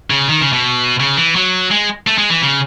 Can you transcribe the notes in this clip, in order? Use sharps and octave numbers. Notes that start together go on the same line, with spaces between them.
C#3
D#3
C#3
B2
C#3
E3
F#3
G#3
A3
G#3
E3
C#3